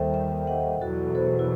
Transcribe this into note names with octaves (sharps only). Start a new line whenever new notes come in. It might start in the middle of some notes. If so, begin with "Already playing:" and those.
Already playing: D#2 D#3 G3 A4 C5 E5 G5
E5 G5
D#5 F#5
E2 B2 F#3 F#4 A4
A4 C5
E4